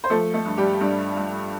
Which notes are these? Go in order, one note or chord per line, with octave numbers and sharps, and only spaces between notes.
C5
F3 A3 A4
A3 A4
G2
G3 G4
G2 D4
G2